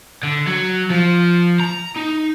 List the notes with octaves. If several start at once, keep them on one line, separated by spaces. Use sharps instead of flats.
D3
F#3
F3
A#5
D#4